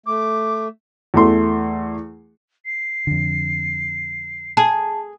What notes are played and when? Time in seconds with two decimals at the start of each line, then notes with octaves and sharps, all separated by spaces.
0.06 A3 D6
1.14 E2 A3 C6
2.66 C7
3.07 F2 D3
4.57 G#4 A5